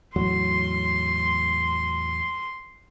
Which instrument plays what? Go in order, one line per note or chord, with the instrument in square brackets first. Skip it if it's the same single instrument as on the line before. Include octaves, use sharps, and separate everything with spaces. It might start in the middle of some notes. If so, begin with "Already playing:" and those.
[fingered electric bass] E2 A2 F#3 [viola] C6